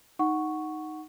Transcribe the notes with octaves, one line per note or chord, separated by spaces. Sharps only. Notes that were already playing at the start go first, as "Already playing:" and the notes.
D#4 F#5 C#6